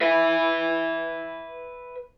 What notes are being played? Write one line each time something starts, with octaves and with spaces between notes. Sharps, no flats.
B4 E5